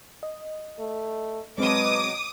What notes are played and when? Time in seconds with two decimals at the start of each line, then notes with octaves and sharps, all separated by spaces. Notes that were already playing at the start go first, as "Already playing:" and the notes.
0.23 D#5
0.79 A3
1.58 B2 F#3 G#3 C4 B4 D6 D#6